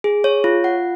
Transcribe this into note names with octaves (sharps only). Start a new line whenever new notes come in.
G#4
C#5
F4
F#5